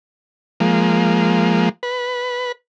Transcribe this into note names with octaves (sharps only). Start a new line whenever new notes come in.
F3 G#3 A#3
B4